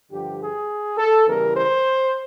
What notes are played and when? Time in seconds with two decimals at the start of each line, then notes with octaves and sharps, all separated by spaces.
0.11 G2 D3 F3 G4
0.40 G#4
0.98 A4
1.26 E2 C#3 E3 G3 A#4
1.55 C5